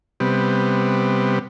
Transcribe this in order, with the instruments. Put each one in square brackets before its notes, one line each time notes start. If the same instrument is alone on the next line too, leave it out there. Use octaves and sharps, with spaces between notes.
[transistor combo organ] C3 G3 B3